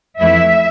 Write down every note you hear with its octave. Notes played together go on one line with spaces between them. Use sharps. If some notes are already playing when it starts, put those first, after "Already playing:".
F2 E3 A3 E4 E5